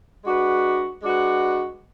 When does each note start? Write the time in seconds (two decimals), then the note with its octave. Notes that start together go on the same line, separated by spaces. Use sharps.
0.24 G#3 D4 F#4 B4
1.03 G#3 D4 F#4 B4